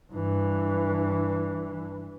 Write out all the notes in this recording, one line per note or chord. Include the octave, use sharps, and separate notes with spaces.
G2 E3